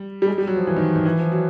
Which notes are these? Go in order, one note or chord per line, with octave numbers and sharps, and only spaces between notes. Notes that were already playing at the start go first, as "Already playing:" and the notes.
Already playing: G3
G3
G#3
G3
F#3
F3
E3
D#3
D#3
E3
F3
F#3